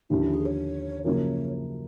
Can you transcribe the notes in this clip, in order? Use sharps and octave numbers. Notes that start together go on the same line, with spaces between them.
D#2 D3 F3 A3 C#4 E4
E4
G#4
C#5
F#2 C#3 F3 A#3 C#5